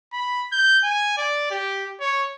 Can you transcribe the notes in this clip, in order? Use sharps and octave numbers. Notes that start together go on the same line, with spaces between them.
B5
G6
G#5
D5
G4
C#5